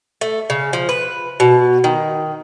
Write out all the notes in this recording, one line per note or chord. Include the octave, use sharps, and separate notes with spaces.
A3
C#3
F3
B4
B2
D#3